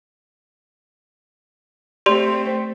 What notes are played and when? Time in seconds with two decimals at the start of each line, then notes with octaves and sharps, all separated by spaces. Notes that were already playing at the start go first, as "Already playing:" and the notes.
2.06 A3 C4 G4 D5 C6